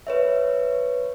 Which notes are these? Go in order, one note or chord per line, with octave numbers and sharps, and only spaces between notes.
B4 C#5 E5